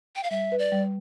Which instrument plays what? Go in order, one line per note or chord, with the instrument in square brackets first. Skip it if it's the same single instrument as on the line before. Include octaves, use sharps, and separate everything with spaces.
[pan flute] G5
F5
[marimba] G3 [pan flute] E5
[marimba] B4
[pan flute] D5
[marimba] G3